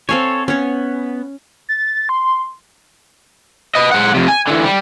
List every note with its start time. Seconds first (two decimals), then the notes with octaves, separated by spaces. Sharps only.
0.09 C4 A4 C#5 F5 G#5
0.48 B3 C#4 C#5
1.69 A6
2.09 C6
3.75 B4 D#5
3.91 G#3 F#5
4.14 F2 C3
4.28 G#5
4.47 D3 E3
4.64 G3